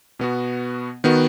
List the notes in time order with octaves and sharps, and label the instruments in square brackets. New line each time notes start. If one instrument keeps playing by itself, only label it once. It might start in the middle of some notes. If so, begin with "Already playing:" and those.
[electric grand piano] B2 B3 F#4
D#3 B3 F#4